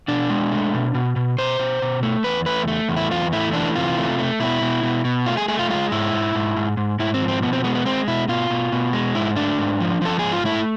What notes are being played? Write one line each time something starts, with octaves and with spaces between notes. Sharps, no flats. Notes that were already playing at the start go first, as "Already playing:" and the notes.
B2 D4
G#3
A3
B2
B2
B2
B2 C5
B2
B2
A3
E2 B4
A3 B4
A3
E2
E4
E2 F4
A3 E4
E3 D4
C3 F4
A3
A3
B2 E4
B2
B2
B2
A3 F4
G#4
A3 G#4
F4
G#3 F4
G#2 E4
G#2
G#2
G#2
G#2
G#2 E4
C4
F3
C4
B2 B3
C4
G#3 B3
B3
G#3 C4
B2 E4
B2 F4
B2
B2
G#3
G#2 E4
A3 D4
G#2
F3
F3 A4
G#2 G#4
F4
A3 E4